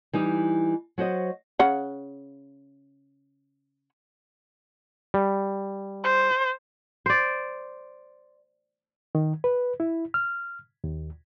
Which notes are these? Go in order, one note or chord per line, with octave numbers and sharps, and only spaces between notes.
E3 G3 D#4
F#3 F#4 C5 D#5
C#3 F#5
G3
C5
C5 D5
D#3
B4
E4
F6
D#2